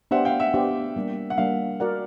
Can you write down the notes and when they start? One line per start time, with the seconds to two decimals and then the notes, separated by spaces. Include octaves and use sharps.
0.11 B3 D4 G4 C5 E5 F#5
0.25 F5 G5
0.40 E5 F#5
0.54 B3 D4 G4 C5
0.96 G3 A#3 D4
1.30 F#5
1.38 G3 A#3 D4 F5
1.80 F#4 A#4 D5 F#5